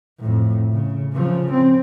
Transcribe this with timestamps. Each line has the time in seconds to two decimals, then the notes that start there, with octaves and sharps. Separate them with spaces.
0.20 F2 A2
0.72 C#3
1.13 C#3 F3
1.52 C4